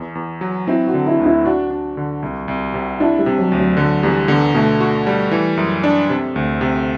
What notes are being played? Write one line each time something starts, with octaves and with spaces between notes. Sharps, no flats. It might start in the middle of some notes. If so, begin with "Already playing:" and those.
Already playing: E2
E2
F#3
C4 E4
F#4
D3
E4
D2
E4
D4 F#4
D4
D3
C2
C2
C3
D4 E4
G3
C3
F#3
D2
F#3
D3 F#3
E2 G3
D3 B3
B2 A3
F#4
G3
E3
F#2
D4
C3
D2
C3